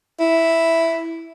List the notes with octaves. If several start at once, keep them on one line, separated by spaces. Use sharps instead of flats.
E4